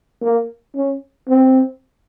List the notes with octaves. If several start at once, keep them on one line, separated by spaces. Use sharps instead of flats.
A#3
C#4
C4